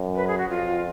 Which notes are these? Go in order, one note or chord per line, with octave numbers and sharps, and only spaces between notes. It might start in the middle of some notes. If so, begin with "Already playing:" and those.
Already playing: F#2
B4
G#4
F#4
F2 F4